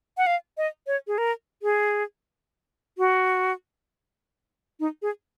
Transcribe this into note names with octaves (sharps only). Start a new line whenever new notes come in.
F#5
F5
D#5
C#5
G#4
A#4
G#4
F#4
D#4
G#4